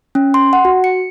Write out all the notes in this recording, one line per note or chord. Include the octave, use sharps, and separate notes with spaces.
C#4
C6
F#5
F#4
C#7